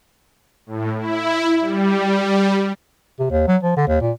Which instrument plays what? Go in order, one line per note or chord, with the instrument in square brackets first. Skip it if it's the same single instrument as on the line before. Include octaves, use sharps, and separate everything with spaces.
[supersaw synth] A2
E4
G3
[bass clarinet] C3
D#2
F#3
F3
D3
D#2
A#2